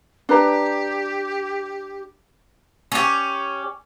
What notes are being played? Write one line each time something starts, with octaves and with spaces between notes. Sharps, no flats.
D4 G4 B4 A#5
C#4 G4